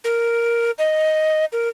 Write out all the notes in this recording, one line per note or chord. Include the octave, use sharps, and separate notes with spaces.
A#4
D#5
A#4